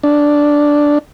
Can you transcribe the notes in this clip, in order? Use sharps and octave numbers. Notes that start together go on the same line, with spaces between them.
D4